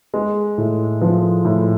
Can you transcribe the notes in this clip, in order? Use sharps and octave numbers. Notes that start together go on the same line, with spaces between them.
G#3
A2
F3
A2